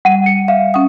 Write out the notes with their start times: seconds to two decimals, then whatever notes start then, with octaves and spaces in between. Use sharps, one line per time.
0.05 G3 F#5 D#7
0.26 C#7
0.48 E5 F5
0.74 C#4 F#5 D#6